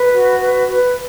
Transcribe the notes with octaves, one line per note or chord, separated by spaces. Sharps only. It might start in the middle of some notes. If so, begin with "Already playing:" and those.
Already playing: B4
F#4
B4
B4